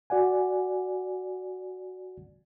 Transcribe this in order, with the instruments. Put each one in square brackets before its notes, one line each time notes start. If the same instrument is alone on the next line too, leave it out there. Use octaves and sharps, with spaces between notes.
[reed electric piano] F#4 D5 F#5 G#5